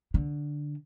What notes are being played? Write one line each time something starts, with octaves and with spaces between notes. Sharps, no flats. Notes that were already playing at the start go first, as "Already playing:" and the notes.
D3